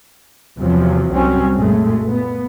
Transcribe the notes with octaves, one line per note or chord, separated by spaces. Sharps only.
E2 C3 F3 F#3
C2 F#3 G3 C4 C#4
F#2 A#2 G#3 A3
A#2 B3